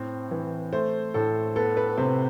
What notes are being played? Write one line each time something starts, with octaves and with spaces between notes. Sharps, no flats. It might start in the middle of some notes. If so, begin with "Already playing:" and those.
Already playing: A2 C4
E3
A3 C5
A2 A4
B3 A4
B4
C3 C5